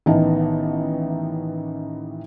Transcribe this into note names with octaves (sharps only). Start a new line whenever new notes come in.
A1 D#3 E3 B3 D#4 A5